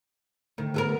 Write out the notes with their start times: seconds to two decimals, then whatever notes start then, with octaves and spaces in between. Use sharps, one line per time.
0.58 D3 D#3 A3
0.74 B3 A4 A#4